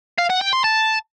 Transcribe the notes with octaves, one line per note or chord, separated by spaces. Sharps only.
F5
F#5
G5
C6
A5